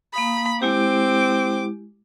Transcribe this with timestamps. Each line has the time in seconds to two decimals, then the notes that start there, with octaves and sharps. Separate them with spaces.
0.14 A#3 F5 B5 D#6
0.62 G#3 C4 E4 G4 D6